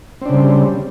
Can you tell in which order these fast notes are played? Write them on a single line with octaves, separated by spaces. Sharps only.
C4 D4 C#3 G3